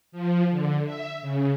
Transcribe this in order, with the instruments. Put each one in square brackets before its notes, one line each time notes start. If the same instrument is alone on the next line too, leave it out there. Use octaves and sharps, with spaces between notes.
[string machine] F3
D3
E5
C#3